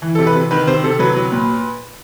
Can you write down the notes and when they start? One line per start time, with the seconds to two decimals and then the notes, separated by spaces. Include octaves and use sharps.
0.02 E3
0.15 C3 A4
0.27 B4
0.35 C3
0.51 D#3 B4
0.67 C3 C5
0.83 C3 A4
0.99 F#3 B4
1.17 F#3
1.32 A#2